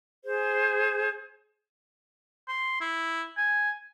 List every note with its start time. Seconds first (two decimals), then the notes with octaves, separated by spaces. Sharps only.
0.24 G#4 C5
2.48 C6
2.81 E4
3.37 G#5